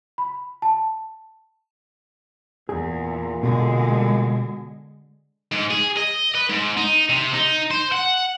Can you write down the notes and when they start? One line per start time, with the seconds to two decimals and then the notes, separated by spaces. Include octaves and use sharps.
0.18 B5
0.62 A5
2.69 E2 A#2 G#4
3.43 B2 D3 G#3
5.52 G#2
5.71 G#4
5.97 D#5
6.35 B4
6.50 G#2
6.77 D#4
7.10 C3
7.34 D#4
7.71 C5
7.92 F#5